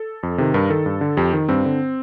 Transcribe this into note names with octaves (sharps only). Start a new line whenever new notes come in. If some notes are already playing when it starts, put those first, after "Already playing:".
Already playing: A4
F2
C3 D#3
G2 A#4
D#3 A4
G2
D3
F2 G4
D#3
G2 C4
D3